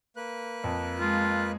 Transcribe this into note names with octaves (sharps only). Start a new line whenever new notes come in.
A#3 B4 F#6
F2
G#3 F4